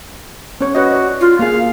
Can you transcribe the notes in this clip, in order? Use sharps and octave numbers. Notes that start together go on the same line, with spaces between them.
C#4 C#5
F#4 B4 C#5 D#5
D5
F4
A#3 G#4 F5